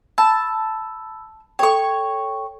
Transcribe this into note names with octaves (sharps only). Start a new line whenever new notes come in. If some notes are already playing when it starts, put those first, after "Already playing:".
A5 B5 E6
A4 C#5 G5 C#6